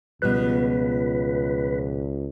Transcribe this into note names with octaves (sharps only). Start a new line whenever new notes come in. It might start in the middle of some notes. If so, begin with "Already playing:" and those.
C#2 B2 F3 G3 B4